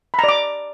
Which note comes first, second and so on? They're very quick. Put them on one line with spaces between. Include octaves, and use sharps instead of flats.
B5 A#5 D5 D6